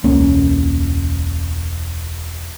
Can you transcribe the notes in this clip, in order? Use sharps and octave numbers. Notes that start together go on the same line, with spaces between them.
E1 C#2 A#3 C#4